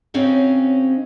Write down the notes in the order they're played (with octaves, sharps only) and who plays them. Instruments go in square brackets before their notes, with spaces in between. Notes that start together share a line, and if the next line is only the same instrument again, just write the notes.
[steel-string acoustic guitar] C#3 C4 C#4 D#4 F#4